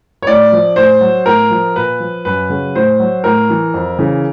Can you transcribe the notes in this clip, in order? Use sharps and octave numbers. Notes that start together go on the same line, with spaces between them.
C#5
A2 D5
F3
A2 C5
F#3
A2 A#4
F3
A#2 B4
F3
F#2 B4
C#3 F#3
A2 C5
F#3
A2 A#4
E3
F2
C#3 E3